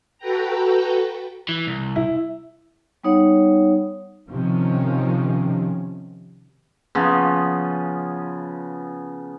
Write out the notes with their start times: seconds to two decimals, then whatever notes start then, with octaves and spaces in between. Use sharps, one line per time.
0.18 F#4 A4 B4 G5 A#5
1.49 E3
1.67 C2
1.96 E4
3.04 G3 B3 D#4 C#5 F#5
4.30 C3 D#3 F3 C#4
6.95 C#3 F3 B3